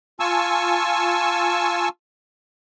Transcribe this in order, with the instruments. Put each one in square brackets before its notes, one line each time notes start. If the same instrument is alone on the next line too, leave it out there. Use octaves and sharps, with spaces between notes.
[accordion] F4 G#5 A5 C#6 E6